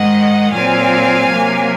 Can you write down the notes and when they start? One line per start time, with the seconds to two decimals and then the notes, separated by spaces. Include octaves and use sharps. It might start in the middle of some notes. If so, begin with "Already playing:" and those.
Already playing: G#2 D#3 G#3 D#5 F#5
0.51 A#2 F#3 C4 F5 G#5
1.29 C3 F#3 A#3